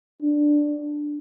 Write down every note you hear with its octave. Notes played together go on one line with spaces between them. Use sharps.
D4